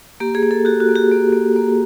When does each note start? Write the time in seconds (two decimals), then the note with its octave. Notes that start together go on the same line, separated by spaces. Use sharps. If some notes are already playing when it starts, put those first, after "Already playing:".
0.20 A#3 G4
0.35 G#4
0.43 A#3
0.51 A4
0.65 F#4 G4
0.80 F#4
0.89 A#3
0.95 G4
1.11 A#3
1.33 A#3
1.56 A#3